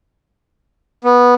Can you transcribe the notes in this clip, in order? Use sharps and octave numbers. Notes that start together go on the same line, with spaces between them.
B3